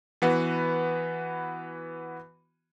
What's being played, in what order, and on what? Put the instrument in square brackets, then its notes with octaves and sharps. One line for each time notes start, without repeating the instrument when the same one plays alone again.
[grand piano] E3 B3 F#4